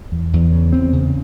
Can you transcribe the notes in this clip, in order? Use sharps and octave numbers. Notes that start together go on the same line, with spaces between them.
E2
E2
C#3
E2 C4
C#3